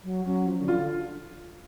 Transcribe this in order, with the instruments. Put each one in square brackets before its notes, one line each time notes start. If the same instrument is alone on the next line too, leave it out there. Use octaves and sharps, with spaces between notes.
[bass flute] F#3
[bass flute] F#3 [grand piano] C#4
[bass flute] F3
D3
[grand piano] F4